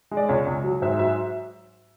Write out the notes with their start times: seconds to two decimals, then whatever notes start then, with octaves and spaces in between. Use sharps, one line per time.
0.11 G#3
0.17 D5
0.29 C#2 C#5
0.46 C#2
0.64 F#3
0.82 G#2 E5
0.99 F#3 E5